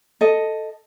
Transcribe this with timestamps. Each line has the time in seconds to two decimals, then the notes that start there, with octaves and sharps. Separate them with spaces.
0.21 A4 D#5